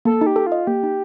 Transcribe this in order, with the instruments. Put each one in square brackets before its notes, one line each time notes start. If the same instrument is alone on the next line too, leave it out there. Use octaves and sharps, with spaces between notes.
[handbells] A#3 [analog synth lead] A4
[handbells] D#4
[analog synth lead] G4
[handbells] A4
[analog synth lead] F4
[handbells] D#5
[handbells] A#3 [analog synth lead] G4
[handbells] D#4